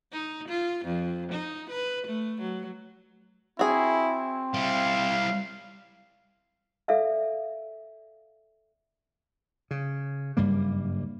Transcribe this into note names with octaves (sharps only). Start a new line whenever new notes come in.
D#4
F4
F2
D#4
B4
A3
F#3
C4 E4 F#4 G#4
G3 E4 F5
A4 D5 E5 F5
C#3
F#1 G2 G3 A#3